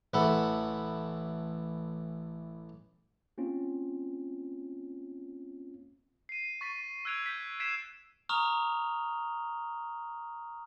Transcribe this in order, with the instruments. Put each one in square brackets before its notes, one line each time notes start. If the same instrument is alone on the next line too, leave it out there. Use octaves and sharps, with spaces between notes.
[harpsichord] A1 E3 A4 F#5 B5
[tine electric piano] A#3 C4 C#4 F4
[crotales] C7 D#7
C#6 A6 B6 D#7
E6 F#6 G#6 D7 F7
G6 B6
G#6 B6 C7 D7 E7
[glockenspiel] A#5 C#6 D#6 F6 F7 G7